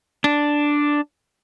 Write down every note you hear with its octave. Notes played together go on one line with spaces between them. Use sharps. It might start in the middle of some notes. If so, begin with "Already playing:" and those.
D4